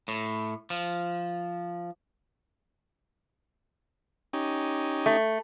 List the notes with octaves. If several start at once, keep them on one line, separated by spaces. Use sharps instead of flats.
A2
F3
C#4 D#4 G4
A3